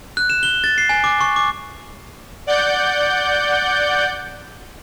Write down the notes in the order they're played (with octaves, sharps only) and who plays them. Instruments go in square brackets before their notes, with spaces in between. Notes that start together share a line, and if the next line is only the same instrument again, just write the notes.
[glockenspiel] F#6
E7
G7
A6
C7
G#5
D6
C#6
D6
[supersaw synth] D5 F#5 G6